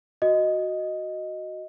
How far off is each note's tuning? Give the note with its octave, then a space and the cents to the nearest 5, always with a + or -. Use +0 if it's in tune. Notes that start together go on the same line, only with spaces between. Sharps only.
F#4 +0 D#5 +0